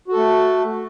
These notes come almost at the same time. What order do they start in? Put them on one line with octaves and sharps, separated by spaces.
F#4 A4 A3